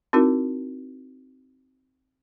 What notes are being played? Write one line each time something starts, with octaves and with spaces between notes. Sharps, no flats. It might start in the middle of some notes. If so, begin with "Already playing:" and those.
C4 D#4 E4 F#4 A#4